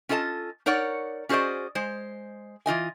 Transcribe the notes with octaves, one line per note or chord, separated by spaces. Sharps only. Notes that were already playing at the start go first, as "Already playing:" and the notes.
C#4 F4 A4 D#5 A5
D#4 A#4 C#5 D5 F#5
C#4 F#4 G#4 C5 D5 D#5
G#3 C5
E3 F4 D#5 G#5